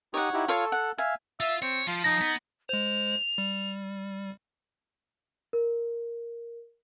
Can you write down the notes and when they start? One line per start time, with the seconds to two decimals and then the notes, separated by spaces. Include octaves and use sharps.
0.14 D#4 G4 C#5 F#5 D#6
0.33 D#4 E4 G4
0.48 F4 A4 C#5 F5
0.72 F#5
0.98 E5 F5 G#5
1.40 F4 E5
1.62 C4 C#5
1.87 F3 F4
2.04 D#4 A#6
2.21 B3
2.69 G#3 C5 F7
3.38 G3
5.53 A#4